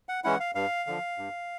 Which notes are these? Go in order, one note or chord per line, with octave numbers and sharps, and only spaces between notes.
F#5
E3 G#3 C#4 E4 F#5
F5
G2 F5
D3 F3
G2